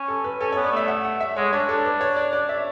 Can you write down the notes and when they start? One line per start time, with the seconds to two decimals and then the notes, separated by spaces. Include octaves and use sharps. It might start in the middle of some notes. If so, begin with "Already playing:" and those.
Already playing: C#4
0.08 A4
0.24 B4
0.40 C#4 A4
0.52 C#5
0.56 B3
0.64 D5
0.72 A3 E5
0.88 F#5
1.05 F#5
1.20 E5
1.36 G#3 C#5
1.53 D4 C#5
1.69 D4 A4
1.85 B4
2.01 C#5
2.16 D5
2.33 D5
2.49 E5